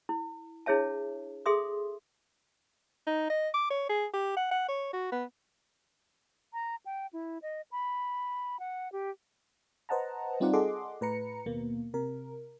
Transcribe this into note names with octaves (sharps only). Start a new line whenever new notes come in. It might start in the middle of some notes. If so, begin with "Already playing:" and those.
E4
D4 E4 G#4 C#5 E5 A5
G#4 A4 E5 C6 D#6
D#4
D#5
D6
C#5
G#4
G4
F#5
F#5
C#5
F#4
B3
A#5
G5
E4
D#5
B5
F#5
G4
B4 C5 D#5 F#5 A5 A#5
G3 C4 D#4 F4 D5 F#5
G#4 A4 D#5 F#5 C6 D6
A2 B4 A#5 C#7
D#2 B2 A#3
C3 A#4